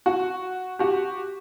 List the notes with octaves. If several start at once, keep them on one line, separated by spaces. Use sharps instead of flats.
F#4
F#4 G4